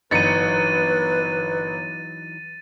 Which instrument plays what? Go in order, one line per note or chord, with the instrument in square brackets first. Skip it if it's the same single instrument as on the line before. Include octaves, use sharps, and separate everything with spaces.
[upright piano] G1 C#7 [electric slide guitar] E3 F#3 D#4 [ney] B4 [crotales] A6 D#7